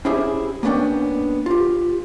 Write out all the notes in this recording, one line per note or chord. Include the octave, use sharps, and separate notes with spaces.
C#4 E4 G4 G#4 C5 E5
A#3 B3 C#4 D4 D5 G5
F4 G4